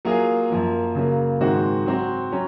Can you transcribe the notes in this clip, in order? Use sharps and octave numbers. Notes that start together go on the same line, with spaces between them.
F#3 A#3 F4 G#4
F#2 F3 A#3
C#3 F#3 A#3
G#2 D#3 G#3 C4 F#4
F#3 C4 F#4
F#3 C#4